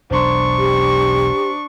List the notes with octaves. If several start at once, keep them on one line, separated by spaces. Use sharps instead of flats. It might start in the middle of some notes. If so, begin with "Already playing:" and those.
E1 B1 D4 C5 A#5 C6 C#6
G4